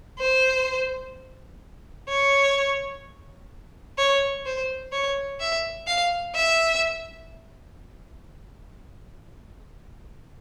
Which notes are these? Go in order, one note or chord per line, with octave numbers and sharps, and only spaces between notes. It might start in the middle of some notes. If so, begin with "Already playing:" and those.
C5
C#5
C#5
C5
C#5
E5
F5
E5